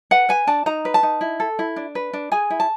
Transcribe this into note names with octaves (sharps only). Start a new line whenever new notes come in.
B4 F#5
B4 G#5
D4 A5
D#4 A#5
B4
A5
D#4
E4
A4
E4
D4
B4
D4
G#4 G#5
E4
A5